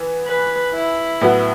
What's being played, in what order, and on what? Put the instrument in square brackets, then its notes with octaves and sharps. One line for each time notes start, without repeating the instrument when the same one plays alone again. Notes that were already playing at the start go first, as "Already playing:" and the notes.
Already playing: [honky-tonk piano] E3 B3
[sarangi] B4
E4
[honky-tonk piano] A2 F#3 B3 F#4